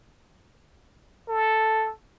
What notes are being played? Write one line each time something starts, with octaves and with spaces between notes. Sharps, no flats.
A4